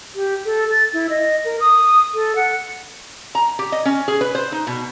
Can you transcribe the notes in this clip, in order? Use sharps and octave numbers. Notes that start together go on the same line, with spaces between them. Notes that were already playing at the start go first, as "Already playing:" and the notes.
G4
A4
A6
E4
D#5
A#4
D#6
A4
F#5
A#5
G4
D#5
C#4
G#4
B4
C5
D#4
B2